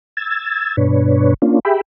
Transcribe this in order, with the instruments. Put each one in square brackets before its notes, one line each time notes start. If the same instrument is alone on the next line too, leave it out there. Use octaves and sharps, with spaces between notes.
[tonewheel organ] E6 G#6 A6
G2 B2 D4 B4 C#5
A#3 C#4 D4 F4
G4 G#4 E5 G5 B5